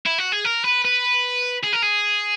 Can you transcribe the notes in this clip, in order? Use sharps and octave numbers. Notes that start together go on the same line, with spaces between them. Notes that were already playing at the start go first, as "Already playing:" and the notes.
E4
F#4
G#4
A#4
B4
B4
G#4
A#4
G#4